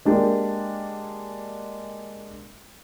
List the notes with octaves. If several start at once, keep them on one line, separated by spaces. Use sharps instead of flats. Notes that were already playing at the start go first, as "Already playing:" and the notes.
G#3 A#3 D4 G4